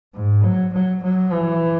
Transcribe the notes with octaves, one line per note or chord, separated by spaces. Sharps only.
G#2
F#3
F#3
F#3
E3